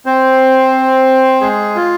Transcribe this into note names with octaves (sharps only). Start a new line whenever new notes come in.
C4 C5
G#3 G#4
F4